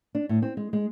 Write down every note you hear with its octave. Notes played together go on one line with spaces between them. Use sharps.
D4
A2
C4
G#3
G#3